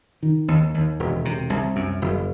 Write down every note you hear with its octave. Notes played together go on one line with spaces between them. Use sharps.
D#3
D#2
D#2
E1
C3
C2
F#2
F#1